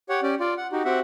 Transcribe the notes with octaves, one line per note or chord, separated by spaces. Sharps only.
G4 C#5 F#5
C#4 G4 D5
F4 D5
F#5
D#4 F#4 G4
C4 F#4 G4 E5 F#5